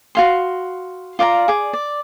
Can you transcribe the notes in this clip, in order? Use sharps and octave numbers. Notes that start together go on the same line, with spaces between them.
F#4 F5 C6
F4 D5 F5 A#5
G#4 D5
D5